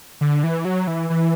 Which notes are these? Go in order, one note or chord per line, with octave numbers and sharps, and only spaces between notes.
D3
E3
F#3
E3
E3